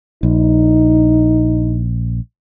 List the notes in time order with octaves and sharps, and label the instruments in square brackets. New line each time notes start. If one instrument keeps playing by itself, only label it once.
[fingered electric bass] A#1 [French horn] D#4